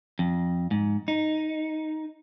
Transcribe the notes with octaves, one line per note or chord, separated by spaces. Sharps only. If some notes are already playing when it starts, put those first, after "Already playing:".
F2
G#2
D#4